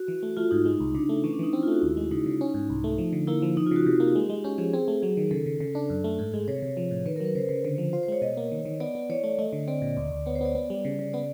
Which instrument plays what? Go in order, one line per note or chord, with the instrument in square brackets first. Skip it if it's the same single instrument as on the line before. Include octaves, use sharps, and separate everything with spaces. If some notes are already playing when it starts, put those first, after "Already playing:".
Already playing: [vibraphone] F#4
[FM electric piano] E3
A3
[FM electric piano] A3 [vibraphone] F4
[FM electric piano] G#2 [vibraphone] D#4
[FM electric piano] G#3
C2
[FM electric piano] C#3 [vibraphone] D4
[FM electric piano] A3
[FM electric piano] E3 [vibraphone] C#4
[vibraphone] D4
[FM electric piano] E3 [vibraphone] D#4
[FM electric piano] C4 [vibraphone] E4
[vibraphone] F4
[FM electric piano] A3 [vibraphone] F#4
[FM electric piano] D#2 [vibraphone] E4
[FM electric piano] G#3
[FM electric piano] C#3 [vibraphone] D#4
[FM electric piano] C#3
C#4
G#2
C2
A3
F3
D3
[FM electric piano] A#3 [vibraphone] E4
[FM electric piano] F3
[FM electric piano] F3 [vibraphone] D#4
[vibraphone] F4
[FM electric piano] C#3
[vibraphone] F#4
[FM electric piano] C3 [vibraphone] G4
[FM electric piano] A#3
G#3
G#3
[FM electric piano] C#4 [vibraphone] G4
[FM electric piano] F3 [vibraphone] G#4
[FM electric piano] C4 [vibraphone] G#4
[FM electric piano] A3
[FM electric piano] F#3 [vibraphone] G#4
[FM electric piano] D#3
[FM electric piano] C#3 [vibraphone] A4
[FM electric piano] C#3
C#3
D4
F#2
A3
[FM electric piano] G#2 [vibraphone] A4
[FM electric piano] G#3 [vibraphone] G#4
[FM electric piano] C3 [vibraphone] C#5
[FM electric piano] C3
F3
A2
[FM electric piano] D#3 [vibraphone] B4
[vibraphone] A#4
[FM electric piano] F#3 [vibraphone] B4
[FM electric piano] C#3 [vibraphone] C5
[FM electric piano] C#3
D3
F3
[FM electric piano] F4 [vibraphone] C5
[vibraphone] C5
[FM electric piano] G#3 [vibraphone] C#5
[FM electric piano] B2 [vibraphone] D#5
[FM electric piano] A#3
D#3
D#3
[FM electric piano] B3 [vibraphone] D5
[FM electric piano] B3
[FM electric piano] E3 [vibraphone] C#5
[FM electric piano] A3 [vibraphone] D5
[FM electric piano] A3 [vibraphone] D#5
[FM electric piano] D3
[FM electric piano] C4 [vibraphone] D5
[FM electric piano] A#2
D2
D2
[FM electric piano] B3 [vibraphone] C#5
[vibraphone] C5
[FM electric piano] B3 [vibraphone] D5
[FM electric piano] B3
G3
C#3
C#3
[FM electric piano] B3 [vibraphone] D5